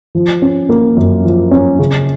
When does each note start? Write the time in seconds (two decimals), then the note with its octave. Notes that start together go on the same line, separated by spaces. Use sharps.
0.15 F3
0.42 C#4
0.69 A#3
0.97 F#2
1.25 F3
1.51 C#4
1.79 C#3